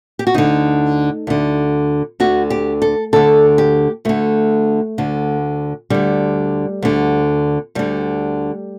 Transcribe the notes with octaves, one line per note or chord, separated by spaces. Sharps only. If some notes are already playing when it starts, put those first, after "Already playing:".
G4
F#4
D2 D3 D#4
D2 D3
D2 D3 F#4
G4
A4
D2 D3 A4
G4
D2 D3 A3
D2 D3
D2 D3 G3
D2 D3
D2 D3 G3